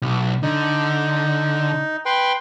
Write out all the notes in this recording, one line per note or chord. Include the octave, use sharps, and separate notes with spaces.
B1
D3 D#4
B4 G5 C6